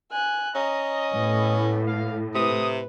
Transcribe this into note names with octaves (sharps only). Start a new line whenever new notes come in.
G#5 F#6
C#4 D#5 A#5
A2 B3
F5
C3 B4 D#6